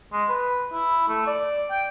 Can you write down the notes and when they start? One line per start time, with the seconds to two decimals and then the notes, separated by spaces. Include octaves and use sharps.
0.12 G#3
0.29 B4
0.72 E4
1.09 A3
1.27 D5
1.71 G5